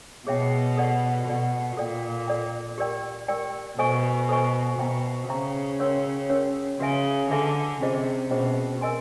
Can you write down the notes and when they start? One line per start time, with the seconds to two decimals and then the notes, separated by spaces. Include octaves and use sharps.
0.27 B2 G#4 C#5 E5 G5
0.77 A4 D5 F#5
1.27 B2 A4 D5 F#5
1.77 A#2 A4 D5 G5
2.28 A4 D5 G5
2.78 G4 A#4 D5 G5
3.28 G4 A#4 D5 G5
3.78 B2 A4 C5 D#5 G#5 C#6
4.29 A4 C5 D#5 G#5 C#6
4.79 B2 C5 E5 G5 A#5 C#6
5.29 C#3 C5 E5 G5 A#5 C#6
5.80 C#4 F#4 A#4 C#5
6.30 C#4 F#4 A#4 C#5
6.80 C#3 F#4 B4 E5 G#5
7.30 D3 F#4 B4 E5 G#5
7.81 C3 C#4 F4 G#4 C5 D#5
8.30 B2 C#4 F4 G#4 C5 D#5
8.81 A#4 D#5 G#5 C6